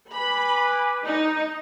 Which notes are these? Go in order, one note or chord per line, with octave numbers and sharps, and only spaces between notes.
B4 G#5 B5 D6
D#4